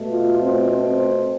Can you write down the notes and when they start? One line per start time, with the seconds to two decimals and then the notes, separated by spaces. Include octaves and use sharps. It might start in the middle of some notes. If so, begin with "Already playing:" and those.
Already playing: B2 A3
0.09 F4
0.40 C4
0.70 C4